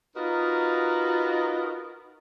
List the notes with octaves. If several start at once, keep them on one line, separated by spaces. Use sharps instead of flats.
D#4 F4 F#4 A#4 B4 D#5